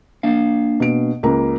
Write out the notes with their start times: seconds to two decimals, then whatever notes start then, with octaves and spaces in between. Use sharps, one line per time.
0.23 A#3 D4 F5
0.80 B2 D7
1.23 C#2 A#3 A#5